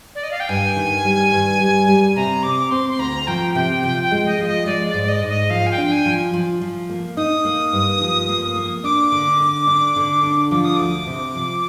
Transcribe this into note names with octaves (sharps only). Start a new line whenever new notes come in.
D5
D#5
F5
G5
G2 G#5
D#3
G3
G2
G3
G3
C3 A#5
C4 D6
C4 C6
C6
D2 A#5
F3 G5
C3 G5
F3 G5
G5
G#3
D#5
F3
D#5
G#3 D5
D5
G#2
D5
D#5
G#2
D#5
F3 F5
G#5
G5
D4
G#5
F3
F3
F3
A#3
D#4 D#6
A#3
G2
F3
A#3
A#3
D4 D6
D3
D4
D4
D3
D4
F3 D6
D#6
D2 D6
C3
F3